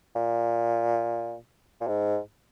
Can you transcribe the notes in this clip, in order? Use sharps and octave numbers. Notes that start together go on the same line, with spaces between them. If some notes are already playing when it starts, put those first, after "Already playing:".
A#2
A#2
G#2